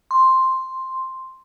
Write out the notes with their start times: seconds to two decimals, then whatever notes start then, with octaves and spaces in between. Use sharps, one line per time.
0.11 C6